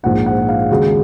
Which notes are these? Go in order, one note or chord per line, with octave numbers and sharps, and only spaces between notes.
A#1 G#2 F3 A#3 F#5
F#5
F5
D#2 C#3 G#3 F#4